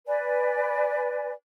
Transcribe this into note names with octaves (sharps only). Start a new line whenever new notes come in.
B4 D5 G#5